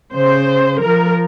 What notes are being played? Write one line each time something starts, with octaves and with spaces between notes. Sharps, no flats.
C#3 C5
F3 A#4